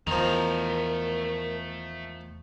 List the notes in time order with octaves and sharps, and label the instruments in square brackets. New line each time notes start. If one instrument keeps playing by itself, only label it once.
[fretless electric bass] E2 [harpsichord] D#3 F3 [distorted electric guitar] A3 A#5 [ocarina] A#4